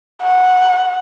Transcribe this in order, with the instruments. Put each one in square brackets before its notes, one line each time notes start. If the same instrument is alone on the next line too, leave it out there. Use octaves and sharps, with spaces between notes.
[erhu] F#5